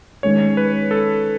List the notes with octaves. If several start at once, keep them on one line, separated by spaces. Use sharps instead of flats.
D#3 G#3 C#4 C#5
B4
A4